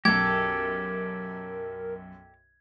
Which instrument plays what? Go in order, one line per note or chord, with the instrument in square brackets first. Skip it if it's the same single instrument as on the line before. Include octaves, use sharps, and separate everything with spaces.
[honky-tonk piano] B1 F#2 [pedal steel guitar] G4 A4 [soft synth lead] A#4 [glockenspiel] G#6